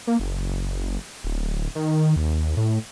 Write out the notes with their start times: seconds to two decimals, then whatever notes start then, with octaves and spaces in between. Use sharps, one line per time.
0.07 A#3
0.20 F#1
1.24 D1
1.75 D#3
2.16 D#2
2.57 A2